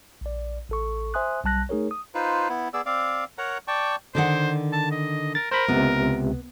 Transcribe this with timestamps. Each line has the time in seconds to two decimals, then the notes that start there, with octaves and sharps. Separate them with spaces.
0.21 A#1 D5
0.69 A1 A4 C#6
1.14 C5 E5 G#5 C6 D#6 F#6
1.44 B1 G3 A5 F#6 A#6
1.69 A3 D#4 G#4 A#4 C#5
1.91 D#6
2.15 D#4 F4 B4 C5
2.49 B3 E4
2.74 B3 G#4 D5 E6
2.86 C4 D5 F5
3.38 A#4 C#5 F#5 A#5
3.68 D5 G5 A5 C#6
4.15 D3 D#3 C5 F#5
4.73 A5
4.92 D#5
5.35 A#4 A6
5.51 A#4 C5 B5
5.68 C#2 C3 B3